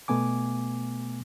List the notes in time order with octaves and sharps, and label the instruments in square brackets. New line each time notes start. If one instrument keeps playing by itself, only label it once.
[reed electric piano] B2 A3 B3 G#5 D6